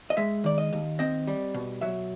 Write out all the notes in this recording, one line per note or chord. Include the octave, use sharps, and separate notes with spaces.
D#5
G#3 E5
D#3 D5
D#5
D#2
C4 D#5
G3
B2
F#3 E5